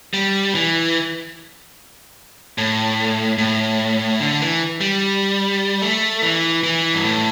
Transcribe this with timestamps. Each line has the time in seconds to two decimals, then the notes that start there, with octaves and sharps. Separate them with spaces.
0.14 G3
0.55 E3
2.58 A2
3.38 A2
4.20 D3
4.41 E3
4.81 G3
5.82 A3
6.22 E3
6.63 E3
6.94 G2
7.04 A2